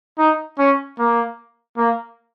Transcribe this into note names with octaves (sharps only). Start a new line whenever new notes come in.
D#4
C#4
A#3
A#3